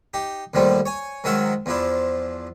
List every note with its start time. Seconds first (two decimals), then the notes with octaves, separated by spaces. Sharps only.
0.14 D#4 G4
0.54 D#2 D3 F3 G3 A3
0.86 C#5 G#5
1.24 G#2 D#3 F#3 A#4 E5 F#5
1.66 E2 F3 D4 E4